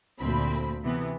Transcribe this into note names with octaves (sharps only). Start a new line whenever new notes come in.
D2 A#2 C4 B5
C3 E3 B3